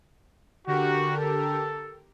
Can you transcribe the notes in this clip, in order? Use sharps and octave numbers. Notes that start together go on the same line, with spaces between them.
D3 F#4 G4 A#4
A4